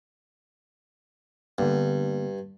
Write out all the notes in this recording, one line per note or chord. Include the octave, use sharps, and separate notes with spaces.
G2 D3 A#3 B3